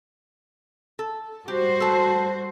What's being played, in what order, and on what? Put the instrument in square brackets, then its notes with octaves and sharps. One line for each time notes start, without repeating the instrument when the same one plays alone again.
[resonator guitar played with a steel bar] A4
[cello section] G3 F#4 C5 [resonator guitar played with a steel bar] G4
[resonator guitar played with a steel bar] A4 B4 A5